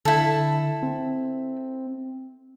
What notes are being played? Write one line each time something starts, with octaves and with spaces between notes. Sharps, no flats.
D3 E4 A4
C4